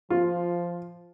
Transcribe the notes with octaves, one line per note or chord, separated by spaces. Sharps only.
F3 F4